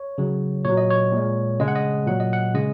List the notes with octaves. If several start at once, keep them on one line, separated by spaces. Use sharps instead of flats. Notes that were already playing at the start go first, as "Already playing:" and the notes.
Already playing: C#5
C#3 F#3
A#2 F#3 C#5
D#5
C#5
A#2 G#3
C#3 G#3 D#5
F#5
D#5
A#2 F#3 F#5
D#5
F#5
C#3 G#3 D#5